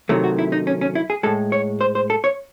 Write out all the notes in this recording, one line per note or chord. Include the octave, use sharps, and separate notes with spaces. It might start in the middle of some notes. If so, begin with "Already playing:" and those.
C3 D#3 F#3 A3 E4
F#4
E4
D#4
C#4
C#4
E4
G#4
A2 G#3 A4
C#5
C5
C5
A4
C#5